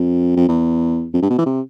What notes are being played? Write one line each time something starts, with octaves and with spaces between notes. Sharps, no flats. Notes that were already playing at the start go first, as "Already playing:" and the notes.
Already playing: F2
F2
E2
F2
G2
B2
E3
C3